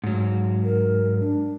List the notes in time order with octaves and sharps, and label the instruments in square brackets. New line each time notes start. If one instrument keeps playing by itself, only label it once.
[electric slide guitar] G#2 F#3
[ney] A#4
D4